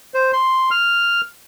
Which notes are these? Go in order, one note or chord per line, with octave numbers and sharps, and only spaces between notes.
C5
C6
F6